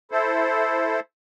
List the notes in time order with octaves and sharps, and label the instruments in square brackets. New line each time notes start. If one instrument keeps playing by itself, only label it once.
[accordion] E4 A4 C5